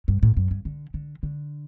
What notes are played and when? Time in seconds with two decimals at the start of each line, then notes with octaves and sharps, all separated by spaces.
0.08 G2
0.23 A2
0.37 F#2
0.51 G2
0.65 D3
0.94 D3
1.23 D3